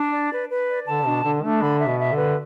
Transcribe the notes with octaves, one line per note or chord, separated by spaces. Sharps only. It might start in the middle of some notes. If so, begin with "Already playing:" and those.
Already playing: D4
D5
B4
B4
D5
D3 A5
B2 D4
D3 D4
A3 D4
D3 B5
E5
B2
E5
D3
B4